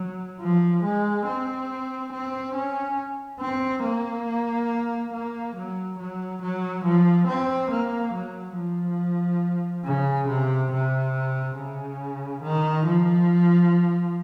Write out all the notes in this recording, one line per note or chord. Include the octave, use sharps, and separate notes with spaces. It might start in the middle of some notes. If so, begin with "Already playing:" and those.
Already playing: F#3
F3
G#3
C4
C4
C#4
C4
A#3
A#3
F#3
F#3
F#3
F3
C4
A#3
F#3
F3
C#3
C3
C3
C#3
D#3
F3